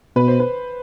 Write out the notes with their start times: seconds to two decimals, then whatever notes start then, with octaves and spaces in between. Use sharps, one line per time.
0.15 B2 B4
0.28 C5
0.40 B4